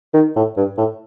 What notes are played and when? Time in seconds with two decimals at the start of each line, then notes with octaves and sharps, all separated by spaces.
0.14 D#3
0.36 A2
0.57 G2
0.78 A2